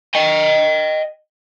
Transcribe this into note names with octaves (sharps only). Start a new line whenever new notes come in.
D#5 G5